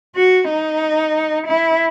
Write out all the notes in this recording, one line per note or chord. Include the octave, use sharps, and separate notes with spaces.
F#4
D#4
E4